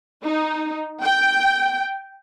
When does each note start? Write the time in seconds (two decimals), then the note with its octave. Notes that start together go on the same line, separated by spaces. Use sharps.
0.24 D#4
1.03 G5